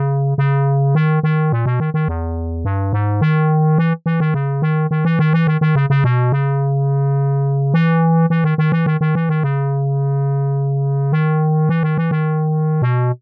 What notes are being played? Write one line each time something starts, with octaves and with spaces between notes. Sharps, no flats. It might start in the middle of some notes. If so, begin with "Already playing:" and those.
Already playing: C#3
C#3
D#3
D#3
A#2
B2
D#3
D#3
E2
G2
G#2
D#3
E3
E3
D#3
C#3
D#3
D#3
E3
D#3
E3
D#3
D#3
C#3
C#3
B2
C#3
E3
E3
D#3
D#3
E3
D#3
D#3
E3
D#3
C#3
D#3
E3
D#3
E3
D#3
B2